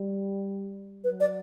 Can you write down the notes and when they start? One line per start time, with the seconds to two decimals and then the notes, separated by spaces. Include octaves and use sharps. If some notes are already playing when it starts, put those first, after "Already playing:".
Already playing: G3
1.04 F#3 B4
1.20 D5